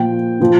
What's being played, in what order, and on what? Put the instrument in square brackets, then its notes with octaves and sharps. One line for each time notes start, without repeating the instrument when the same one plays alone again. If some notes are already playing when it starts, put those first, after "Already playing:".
Already playing: [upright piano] A#2 F3 G5
A#2 F3